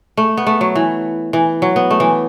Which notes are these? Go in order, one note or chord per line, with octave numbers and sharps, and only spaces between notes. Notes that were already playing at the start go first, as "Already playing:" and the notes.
A3
B3
A3
F#3
E3
E3
F#3
B3
A3
E3